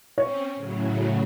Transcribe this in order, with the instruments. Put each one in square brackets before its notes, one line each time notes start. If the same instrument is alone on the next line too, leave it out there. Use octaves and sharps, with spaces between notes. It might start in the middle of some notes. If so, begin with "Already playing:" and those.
[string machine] C4 C#4 [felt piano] C#5
[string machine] A2 C#3 F#3